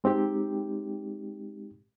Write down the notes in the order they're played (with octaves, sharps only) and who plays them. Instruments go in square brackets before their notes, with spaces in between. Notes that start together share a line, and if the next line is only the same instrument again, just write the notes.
[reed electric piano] G#3 C4 D#4 G4